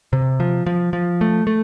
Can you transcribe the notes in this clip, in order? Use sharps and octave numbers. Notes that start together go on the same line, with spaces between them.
C3
F3
F3
F3
A3
A3